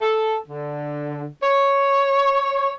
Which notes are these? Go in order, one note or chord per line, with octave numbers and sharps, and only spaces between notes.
A4
D3
C#5